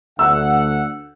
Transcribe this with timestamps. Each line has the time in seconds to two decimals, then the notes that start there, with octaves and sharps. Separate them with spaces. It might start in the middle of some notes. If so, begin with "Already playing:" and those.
0.19 D2 F#5 E6